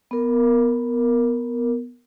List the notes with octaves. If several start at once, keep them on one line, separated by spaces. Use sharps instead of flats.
B3 A#4